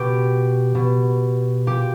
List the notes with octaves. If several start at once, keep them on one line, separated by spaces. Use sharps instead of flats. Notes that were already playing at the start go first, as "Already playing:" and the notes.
Already playing: B2 G4
B2
A#2 G4